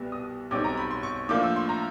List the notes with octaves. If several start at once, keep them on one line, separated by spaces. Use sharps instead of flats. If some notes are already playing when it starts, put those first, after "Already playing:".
Already playing: C2 B2 G3 B3
D#6
B1 B2 G3 C4 D#4 D6
A#5
B5
C6
C#6
A2 F3 A#3 D4 D6
E6
C6
A#5